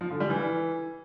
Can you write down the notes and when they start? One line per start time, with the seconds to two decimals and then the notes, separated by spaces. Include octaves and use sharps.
0.01 F3
0.11 D3
0.20 G3
0.30 E3